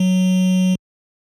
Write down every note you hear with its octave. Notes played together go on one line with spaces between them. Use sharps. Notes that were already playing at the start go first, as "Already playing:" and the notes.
Already playing: F#3